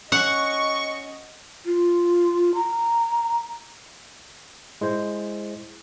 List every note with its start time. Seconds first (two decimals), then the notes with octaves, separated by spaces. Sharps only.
0.12 C#4 D#5 F#5 C#6
1.66 F4
2.55 A#5
4.81 G#3 E4 C5